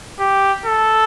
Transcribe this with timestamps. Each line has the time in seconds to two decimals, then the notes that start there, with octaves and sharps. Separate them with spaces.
0.20 G4
0.66 A4